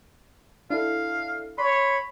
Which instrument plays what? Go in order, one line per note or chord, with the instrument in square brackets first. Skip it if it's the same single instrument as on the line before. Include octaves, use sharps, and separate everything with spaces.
[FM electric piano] D4 E4 A4 [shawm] F5
[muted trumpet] C#5 [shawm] B5 [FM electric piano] C6